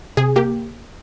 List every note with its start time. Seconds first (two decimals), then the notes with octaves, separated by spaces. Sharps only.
0.17 C3 G#4
0.36 A#3 G4